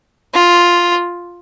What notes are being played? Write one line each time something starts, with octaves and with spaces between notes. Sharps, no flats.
F4